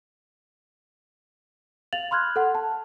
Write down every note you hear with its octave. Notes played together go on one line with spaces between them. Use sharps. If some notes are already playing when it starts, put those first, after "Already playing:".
F5 A6 F7 F#7
B5 C6 F6 F#6 G#6
A4 F#5
A5